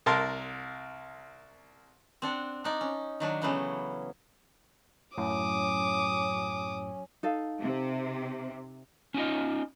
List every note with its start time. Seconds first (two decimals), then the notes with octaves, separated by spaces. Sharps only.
0.06 C2 A#4 A5 C6
2.22 C4 D4 F#5
2.64 D4 D#4 D5
2.81 C#4
3.20 D#3 F#3 D4
3.42 C#3 E3 F#3 A3 B3 C#4
5.18 F#2 A2 F#3 C#4 D6 D#6
7.23 D#4 A4 F5
7.60 C3
9.14 C#4 D#4 F4 D#5